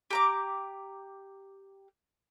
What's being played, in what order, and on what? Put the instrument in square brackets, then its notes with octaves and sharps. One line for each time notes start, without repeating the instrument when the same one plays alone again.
[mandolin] G4 A#5 D6